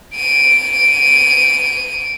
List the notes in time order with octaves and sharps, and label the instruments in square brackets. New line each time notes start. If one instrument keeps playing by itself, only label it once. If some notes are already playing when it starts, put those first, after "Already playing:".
[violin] D7 D#7